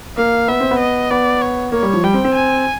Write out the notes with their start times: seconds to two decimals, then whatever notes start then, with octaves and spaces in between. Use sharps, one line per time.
0.17 A#3 F5
0.48 B3 E5
0.60 C4
0.71 B3
0.79 D#5
1.11 B3 D5
1.41 C#5
1.72 A#3 C#5
1.83 G3
1.93 F3
2.04 G3 G5
2.14 C4
2.24 C4
2.34 G#5